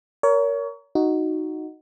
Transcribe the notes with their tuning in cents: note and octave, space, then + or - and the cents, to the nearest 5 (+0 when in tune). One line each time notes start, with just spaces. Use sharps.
A#4 +0 C#5 +30
D#4 +0 F#4 +0